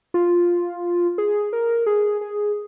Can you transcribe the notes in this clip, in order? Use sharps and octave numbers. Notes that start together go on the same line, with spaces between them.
F4
G#4
A#4
G#4
G#4